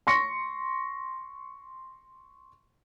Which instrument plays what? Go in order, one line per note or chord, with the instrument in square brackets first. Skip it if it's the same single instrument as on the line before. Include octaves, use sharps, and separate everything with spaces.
[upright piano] C6 C#6 A#6 C#7